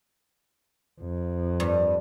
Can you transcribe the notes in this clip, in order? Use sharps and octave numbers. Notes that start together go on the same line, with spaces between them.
F2
G2